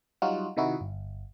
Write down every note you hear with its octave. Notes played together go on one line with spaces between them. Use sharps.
F#3 G3 D#4 F4 F#4
C3 D#3 D#4 E4 F#4
G1